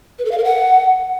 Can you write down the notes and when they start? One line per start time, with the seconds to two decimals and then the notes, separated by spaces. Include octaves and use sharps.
0.19 B4
0.25 A4
0.31 F5
0.38 A#4
0.44 F#5